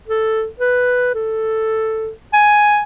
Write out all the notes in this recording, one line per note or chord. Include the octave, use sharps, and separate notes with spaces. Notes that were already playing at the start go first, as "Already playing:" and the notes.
A4
B4
A4
G#5